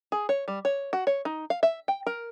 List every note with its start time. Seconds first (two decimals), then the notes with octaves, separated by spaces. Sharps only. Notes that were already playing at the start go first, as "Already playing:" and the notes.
0.12 G#4
0.29 C#5
0.48 G3
0.65 C#5
0.93 F#4
1.07 C#5
1.25 D#4
1.50 F5
1.63 E5
1.88 G5
2.07 A#4